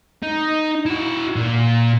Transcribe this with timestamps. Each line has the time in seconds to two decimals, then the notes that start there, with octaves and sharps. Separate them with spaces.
0.23 D#4
0.86 E4 F#4
1.36 A#2